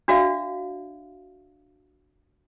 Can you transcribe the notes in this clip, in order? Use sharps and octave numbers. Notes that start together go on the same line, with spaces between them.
D4 F#4 D5 E5 F5